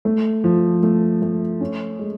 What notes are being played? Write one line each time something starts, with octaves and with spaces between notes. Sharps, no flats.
A3
F3
A3
A3
C#4
G#3